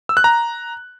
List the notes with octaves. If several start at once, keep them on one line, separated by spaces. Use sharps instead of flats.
E6
F#6
A#5